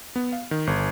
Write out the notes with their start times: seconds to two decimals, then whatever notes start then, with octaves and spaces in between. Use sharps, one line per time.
0.16 B3
0.32 F5
0.51 D#3
0.67 G1